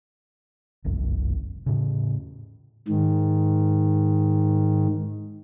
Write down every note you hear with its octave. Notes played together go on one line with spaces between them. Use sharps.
G1 C2 F#2
A2 C#3
G#2 D#3